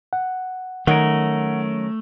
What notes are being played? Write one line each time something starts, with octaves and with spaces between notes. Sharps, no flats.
F#5
D#3 F#3 A3 C#4 A#4 F#5